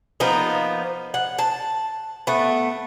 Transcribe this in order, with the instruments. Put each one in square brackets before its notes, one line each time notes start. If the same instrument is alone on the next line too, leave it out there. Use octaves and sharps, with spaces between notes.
[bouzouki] F3 A#3 B3 D#4
F#5
A5
A3 B3